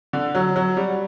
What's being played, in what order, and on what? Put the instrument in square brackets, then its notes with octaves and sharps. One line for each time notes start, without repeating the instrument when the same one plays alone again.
[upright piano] D3
F#3
F#3
G3